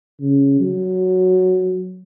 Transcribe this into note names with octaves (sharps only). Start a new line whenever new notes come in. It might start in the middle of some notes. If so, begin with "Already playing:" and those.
C#3
F#3